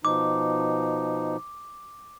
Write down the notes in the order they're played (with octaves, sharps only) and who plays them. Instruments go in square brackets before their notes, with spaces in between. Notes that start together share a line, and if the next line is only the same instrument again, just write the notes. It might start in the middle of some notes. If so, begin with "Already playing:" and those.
[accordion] B2 F3 D#4 [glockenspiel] D6